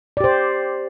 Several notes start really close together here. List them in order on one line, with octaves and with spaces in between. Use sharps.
D5 G4 C5